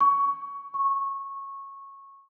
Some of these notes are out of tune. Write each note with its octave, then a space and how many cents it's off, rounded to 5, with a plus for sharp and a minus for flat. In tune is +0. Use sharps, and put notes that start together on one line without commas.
C#6 +15
C#6 -15